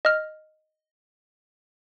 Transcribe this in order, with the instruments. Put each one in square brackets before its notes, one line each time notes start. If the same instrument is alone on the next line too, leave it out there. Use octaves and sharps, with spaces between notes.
[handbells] D#5 F6